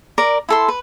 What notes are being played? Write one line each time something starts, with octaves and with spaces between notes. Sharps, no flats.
A#4 D5
E4 A4 C6
B4